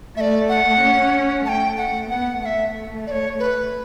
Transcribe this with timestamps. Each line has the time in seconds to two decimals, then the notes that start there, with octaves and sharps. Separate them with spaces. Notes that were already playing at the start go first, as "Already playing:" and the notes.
0.16 A3 E5
0.21 D5
0.49 F#5
0.81 C#4
1.46 A3 A5
1.49 G5
1.78 F#5
2.09 B3 F#5
2.42 A3 F#5
2.46 E5
3.07 D5
3.11 C#5
3.39 B4